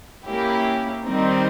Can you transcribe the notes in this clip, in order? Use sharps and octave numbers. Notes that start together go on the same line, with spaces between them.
A#3 C#4 E4 G4
D#3 G3 C4 D#4